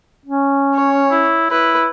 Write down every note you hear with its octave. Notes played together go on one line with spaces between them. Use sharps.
C#4
C#5
E4
E4 B4